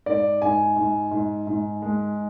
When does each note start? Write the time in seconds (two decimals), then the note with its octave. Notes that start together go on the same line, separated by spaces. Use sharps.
0.06 G#2 D5
0.42 G#2 G#5
0.76 G#2
1.11 G#2
1.47 G#2
1.82 G#3